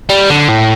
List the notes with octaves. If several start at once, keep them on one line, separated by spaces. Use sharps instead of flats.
G3
D3
A2